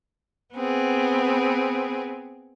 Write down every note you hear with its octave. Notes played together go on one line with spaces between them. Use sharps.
B3 C4 G#4